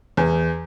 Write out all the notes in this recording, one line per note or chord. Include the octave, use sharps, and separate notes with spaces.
E2